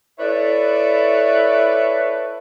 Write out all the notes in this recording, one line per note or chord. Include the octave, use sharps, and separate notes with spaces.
E4 A4 B4 C#5 D5 E5